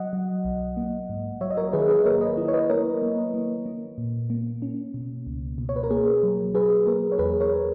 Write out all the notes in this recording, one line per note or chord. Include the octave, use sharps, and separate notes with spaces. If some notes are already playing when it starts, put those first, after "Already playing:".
Already playing: F#3 D#5 F#5
F#3
B1
A#3
G#2
F#3 C#5 E5
D#5
A#4 C#5
D#3 G#4 B4
G#4 B4
A#3 A#4 C#5
B4 D#5
E4
C#5
B4 D#5
A#3 A#4 C#5
A#3
A#3
A#3
A#2
A#3
C#4
B2
C#2
B2
C#5
B4
A#4
A#3 G#4
F#3
F#3 G#4 B4
A#3 A#4
C#5
E2 G#4 B4
A#4 C#5